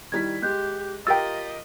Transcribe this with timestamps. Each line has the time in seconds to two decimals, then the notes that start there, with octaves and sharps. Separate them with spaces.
0.12 D#3 G3 E4 G#6 B6
0.42 G#3 G4 F#6 G6
1.07 F4 G4 A#4 D#5 G5 E6 A6